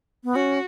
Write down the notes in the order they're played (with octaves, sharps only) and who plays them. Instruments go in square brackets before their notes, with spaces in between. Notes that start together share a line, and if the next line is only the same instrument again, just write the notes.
[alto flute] B3
[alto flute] C#4 [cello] F#4